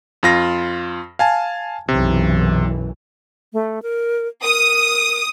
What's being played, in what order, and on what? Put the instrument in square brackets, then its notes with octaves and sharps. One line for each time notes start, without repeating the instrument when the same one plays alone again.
[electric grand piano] F2 F4 A#6
F5 G#5 A5
[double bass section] B1 F#2 E3 [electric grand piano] C3
[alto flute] A3
A#4
[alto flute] A#4 [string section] D#6